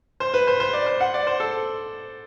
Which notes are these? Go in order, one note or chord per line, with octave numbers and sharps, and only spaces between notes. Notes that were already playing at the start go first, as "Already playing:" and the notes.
C5
B4
C5
C5
D5
C5
F#5
D5
C5
A4